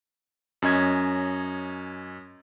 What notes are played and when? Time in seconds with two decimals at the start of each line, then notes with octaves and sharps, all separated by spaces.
0.62 F#2 C#4 D#5 G#6